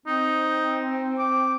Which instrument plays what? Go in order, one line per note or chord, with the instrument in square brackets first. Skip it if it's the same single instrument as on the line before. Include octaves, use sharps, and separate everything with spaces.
[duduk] C4 [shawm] D#4
[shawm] D6